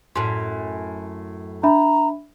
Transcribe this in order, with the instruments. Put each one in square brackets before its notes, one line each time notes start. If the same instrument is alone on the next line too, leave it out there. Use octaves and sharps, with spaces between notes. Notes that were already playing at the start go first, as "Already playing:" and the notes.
[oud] F#2 A2 [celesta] C6
[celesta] D4 E5 B5 [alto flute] A#5